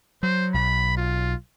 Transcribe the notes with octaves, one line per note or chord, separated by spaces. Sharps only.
F#3 C5
B1 B5
F4